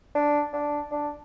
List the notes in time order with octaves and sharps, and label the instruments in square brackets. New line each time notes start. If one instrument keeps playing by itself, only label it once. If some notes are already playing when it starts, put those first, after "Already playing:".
[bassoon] D4
D4
D4